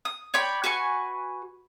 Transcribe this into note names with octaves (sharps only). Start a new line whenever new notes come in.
D#6
C#5 D5 G5 B5
F#4 B4 G#5 C#6